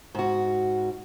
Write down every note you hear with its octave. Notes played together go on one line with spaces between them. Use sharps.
G#2 F#4